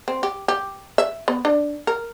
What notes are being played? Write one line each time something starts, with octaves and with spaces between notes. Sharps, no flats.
C4
G4
G4
E5
B3
D4
A#4